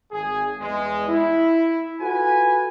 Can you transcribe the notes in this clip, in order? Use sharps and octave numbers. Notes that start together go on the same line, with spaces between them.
G#1 G#4
E2 G#3
E4
F4 F#4 A4 B4 G#5